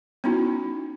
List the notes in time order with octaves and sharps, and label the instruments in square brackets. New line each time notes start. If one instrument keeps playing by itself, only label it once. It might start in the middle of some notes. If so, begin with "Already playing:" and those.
[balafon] B3 C#4 D#4 E4 F#4